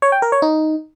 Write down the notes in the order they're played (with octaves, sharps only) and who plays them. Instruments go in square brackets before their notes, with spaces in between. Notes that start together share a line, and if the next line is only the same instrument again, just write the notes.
[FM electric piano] C#5
G5
A#4
C#5
D#4